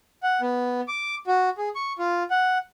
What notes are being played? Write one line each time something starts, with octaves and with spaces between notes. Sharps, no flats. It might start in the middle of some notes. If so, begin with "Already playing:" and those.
F#5
B3
D6
F#4
G#4
C#6
F4
F#5